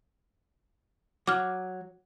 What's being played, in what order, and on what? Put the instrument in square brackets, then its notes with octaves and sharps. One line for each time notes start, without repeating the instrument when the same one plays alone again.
[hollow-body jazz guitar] F#3 [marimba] D6 F6